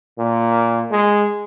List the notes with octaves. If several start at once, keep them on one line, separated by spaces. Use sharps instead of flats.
A#2
G#3